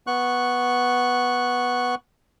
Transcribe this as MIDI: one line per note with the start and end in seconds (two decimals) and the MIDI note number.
0.07 1.95 59
0.07 1.95 85
0.07 1.95 90